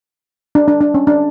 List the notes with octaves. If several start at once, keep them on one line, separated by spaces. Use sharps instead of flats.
D4
D4
D4
C#4
D4